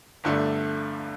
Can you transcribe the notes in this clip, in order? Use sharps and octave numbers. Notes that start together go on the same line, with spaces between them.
G1 G2 D3 A3 D4